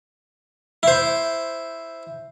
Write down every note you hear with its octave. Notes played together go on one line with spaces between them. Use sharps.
E4 C5